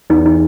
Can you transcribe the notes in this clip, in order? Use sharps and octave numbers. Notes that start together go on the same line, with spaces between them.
E2 D#4
D#4